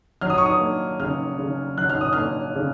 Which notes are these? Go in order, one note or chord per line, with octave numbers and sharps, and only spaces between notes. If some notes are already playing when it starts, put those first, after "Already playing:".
F#3 F6
D#6
C#6
D#6
A#3
C#3 F6
C#3
F#3 F#6
F6
D#6
A#3 F6
C#3